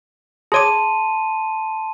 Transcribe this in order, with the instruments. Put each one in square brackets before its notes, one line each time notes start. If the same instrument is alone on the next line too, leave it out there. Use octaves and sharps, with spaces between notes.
[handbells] G#4 C#5 D6 [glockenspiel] A5 C6 D#7